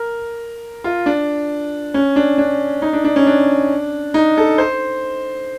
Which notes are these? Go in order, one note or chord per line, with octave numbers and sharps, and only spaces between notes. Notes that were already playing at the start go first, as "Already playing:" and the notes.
Already playing: A#4
F4
D4
C#4
D4
D4
D#4
D4
D4
C#4
D4
D#4
A4
C5